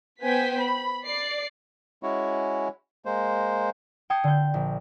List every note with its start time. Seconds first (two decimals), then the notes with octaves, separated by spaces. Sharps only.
0.21 B3 B4 C5 G5 G#5 B6
0.59 B5
1.04 D5 C7
2.03 G#3 C#4 E4 F#4 C#5
3.05 G#3 A#3 C5
4.10 G5 A5 D#6 G#6 C7 C#7
4.24 D3 G6
4.54 A#1